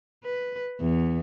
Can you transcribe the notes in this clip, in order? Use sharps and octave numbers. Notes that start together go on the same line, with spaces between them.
B4
E2